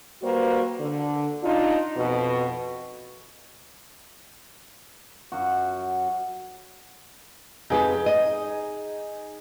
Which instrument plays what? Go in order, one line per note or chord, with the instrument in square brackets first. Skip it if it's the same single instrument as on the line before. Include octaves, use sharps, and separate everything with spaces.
[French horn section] G3 A#3 F#4 B4 C5
D3
D4 D#4 F4
F2 B2
[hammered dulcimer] F#2 F#4
[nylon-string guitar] F2 B3 G4 [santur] D#4 G#4
[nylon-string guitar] D#5